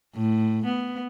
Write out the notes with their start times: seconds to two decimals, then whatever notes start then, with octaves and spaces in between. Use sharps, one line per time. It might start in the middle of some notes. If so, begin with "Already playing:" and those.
0.16 A2
0.66 B3